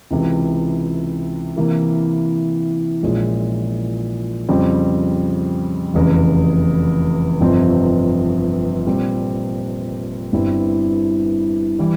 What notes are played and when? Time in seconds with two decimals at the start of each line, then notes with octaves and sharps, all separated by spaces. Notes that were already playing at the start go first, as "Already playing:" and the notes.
0.11 C#2 C3 E3
1.56 C3 E3 A#3 E4 A#4
3.03 A#1 A#2 G#3 C#4
4.49 F2 C#3 G3 C4
5.94 F1 E2 C#3
7.41 G1 F2 C3 F3 C4
8.86 A#2 G3 C4
10.32 G1 G2 G3 C4 E4
11.79 E3 G3